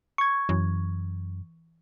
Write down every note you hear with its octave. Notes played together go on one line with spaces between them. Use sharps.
C#6 G#6
F#2 E3